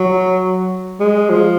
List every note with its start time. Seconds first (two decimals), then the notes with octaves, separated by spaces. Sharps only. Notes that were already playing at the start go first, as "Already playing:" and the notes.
Already playing: F#3
1.00 G#3
1.30 F3